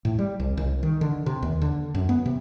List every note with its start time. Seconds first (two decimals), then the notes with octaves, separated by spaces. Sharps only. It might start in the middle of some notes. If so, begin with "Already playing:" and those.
0.05 A2
0.19 G3
0.40 C2
0.57 C2
0.83 D#3
1.01 D3
1.26 C3
1.43 D#2
1.62 D3
1.95 F#2
2.09 B3
2.26 C3